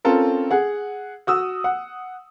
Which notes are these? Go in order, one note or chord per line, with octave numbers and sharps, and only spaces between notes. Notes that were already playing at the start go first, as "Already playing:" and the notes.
C4 C#4 F4 A4 A#4
G#4 F#5
F#4 D#6 E6
F#5